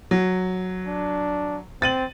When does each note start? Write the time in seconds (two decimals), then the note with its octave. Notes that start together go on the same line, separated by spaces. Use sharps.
0.11 F#3
0.86 D4
1.82 C4 A6 D#7 F#7